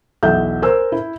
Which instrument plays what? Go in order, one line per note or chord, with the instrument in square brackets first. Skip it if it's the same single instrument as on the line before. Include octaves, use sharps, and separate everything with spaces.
[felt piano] B1 E2 E5 G6
A#4 C5 G#5 E6
E4